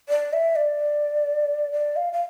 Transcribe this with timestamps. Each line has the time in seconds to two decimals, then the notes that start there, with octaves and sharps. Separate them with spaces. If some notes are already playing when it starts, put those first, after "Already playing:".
0.09 D5
0.33 E5
0.56 D5
1.72 D5
1.96 F5
2.13 F5